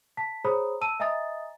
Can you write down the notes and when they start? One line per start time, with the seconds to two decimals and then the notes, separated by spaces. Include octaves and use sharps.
0.17 A5 B6
0.44 G#4 C5 C#5 A#5 B5 D#6
0.81 A5 E6 D#7
1.00 D#5 E5 G#5 A#5 D#6 A6